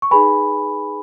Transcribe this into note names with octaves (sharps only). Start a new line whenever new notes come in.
C#6
D#4 G#4 B4 G#5 B5